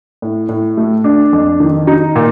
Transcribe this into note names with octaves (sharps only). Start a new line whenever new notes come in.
A2
A2
A3
D4
F2
D#3
D#4
A#2